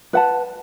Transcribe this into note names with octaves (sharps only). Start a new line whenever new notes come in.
B4 F#5 A5